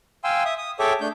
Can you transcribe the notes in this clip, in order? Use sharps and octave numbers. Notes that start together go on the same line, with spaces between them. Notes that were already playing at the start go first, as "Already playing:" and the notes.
F5 G5 G#5 C6 E6
E5 D#6
D#6
G#4 A4 C#5 E5 G5 D6
A3 D4 G6